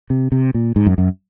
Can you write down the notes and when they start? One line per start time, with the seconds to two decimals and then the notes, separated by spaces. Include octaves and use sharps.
0.10 C3
0.32 C3
0.54 A#2
0.76 G#2
0.87 F#2
0.98 F#2